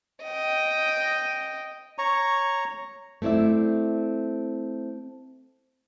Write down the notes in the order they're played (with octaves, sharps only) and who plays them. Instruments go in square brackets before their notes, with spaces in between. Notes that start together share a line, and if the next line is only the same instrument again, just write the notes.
[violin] D#5 G5
[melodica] C#5 A#5 C#6
[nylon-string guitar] A3 C4 E4 D5 E5